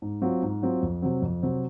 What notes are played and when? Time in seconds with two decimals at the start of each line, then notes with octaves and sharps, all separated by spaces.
0.02 G#2
0.21 F#3 C4 F4
0.42 G#2
0.62 F#3 C4 F4
0.83 F2
1.02 C3 F#3 C4
1.22 F2
1.43 C3 F#3 C4